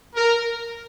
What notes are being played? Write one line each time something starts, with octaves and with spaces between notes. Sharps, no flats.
A#4